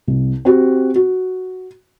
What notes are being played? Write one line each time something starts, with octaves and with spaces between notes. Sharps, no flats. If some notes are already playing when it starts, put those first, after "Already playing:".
C2
C4 F#4 G4
F#4